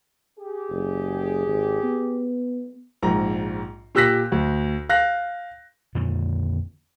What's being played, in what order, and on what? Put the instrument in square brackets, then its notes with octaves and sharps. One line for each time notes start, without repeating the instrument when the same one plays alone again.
[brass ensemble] G4 G#4
[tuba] F#1
G#1
B3
[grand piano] A#1 G#2 A#5
A#2 G4 E6 F#6 A#6 B6
D2
F5 F#6 A#6
[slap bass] F2 A#2 D3 D#3